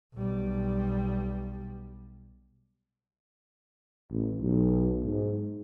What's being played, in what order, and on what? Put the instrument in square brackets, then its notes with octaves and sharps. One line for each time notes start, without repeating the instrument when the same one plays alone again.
[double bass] B1 G3
[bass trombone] A1
B1
G#2